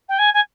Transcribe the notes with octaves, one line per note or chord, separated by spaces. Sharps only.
G5
G#5
G#5